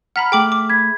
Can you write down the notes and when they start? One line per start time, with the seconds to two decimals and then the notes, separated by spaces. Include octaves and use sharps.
0.16 F#5 A#5 B5 F6 B6
0.32 A3 G#4 G5 D6 F#7
0.52 D6
0.69 B5 G#6 B6